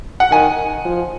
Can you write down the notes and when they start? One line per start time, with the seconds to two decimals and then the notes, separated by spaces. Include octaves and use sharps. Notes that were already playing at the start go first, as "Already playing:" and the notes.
0.20 F#5
0.31 D#3 G#5
0.85 F3